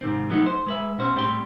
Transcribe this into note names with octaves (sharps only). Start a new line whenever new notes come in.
G#2 C3 D#3 C4
F3 F#3 A3 B3 C4 D#4
C5
G#3 B4 E5
B2 C#4 C5
A2 G3 C4 G4 C6